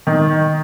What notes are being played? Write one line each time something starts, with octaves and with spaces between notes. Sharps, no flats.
D#3